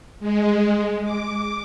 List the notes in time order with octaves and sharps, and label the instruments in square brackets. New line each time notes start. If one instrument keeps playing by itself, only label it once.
[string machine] G#3
D6